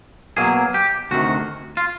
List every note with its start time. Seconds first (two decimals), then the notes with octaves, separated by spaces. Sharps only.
0.37 B2 F#3 A#3 G#4
0.74 G4
1.11 D2 C3 D#3 F#4
1.77 F4